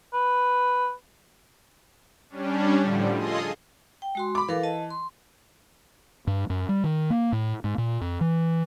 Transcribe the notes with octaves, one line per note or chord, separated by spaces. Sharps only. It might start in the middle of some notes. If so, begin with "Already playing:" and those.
B4
G3 C#4 D4
A2 D3 F3 G3
F4 G#4 A4 D#5 C6 D#6
G5
G#3 F#4 C6
B5 D6
E3 A4 A#4 F5
D#5 A5
C6
G2
F#2
G3
D#3
A#3
A2
G#2
A#2
F2
E3